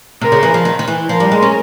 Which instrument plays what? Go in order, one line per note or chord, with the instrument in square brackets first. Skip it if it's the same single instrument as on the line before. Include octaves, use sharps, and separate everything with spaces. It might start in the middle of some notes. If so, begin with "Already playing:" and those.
[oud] C3 [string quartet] A#4
[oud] C#3
E3
F3
D#3
D#3
E3
[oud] F3 [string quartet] A#4
[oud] G3
G#3
C#4